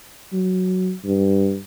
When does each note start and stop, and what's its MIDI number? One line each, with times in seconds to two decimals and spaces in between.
0.33 0.93 54
1.05 1.58 43